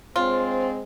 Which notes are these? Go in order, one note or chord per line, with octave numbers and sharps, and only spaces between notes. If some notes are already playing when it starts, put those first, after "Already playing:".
G#3 C4 D4 F4 C5 C#5